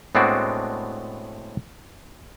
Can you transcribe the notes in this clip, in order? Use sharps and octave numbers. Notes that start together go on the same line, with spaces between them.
A2 G#3 B3 C4 D4 F#4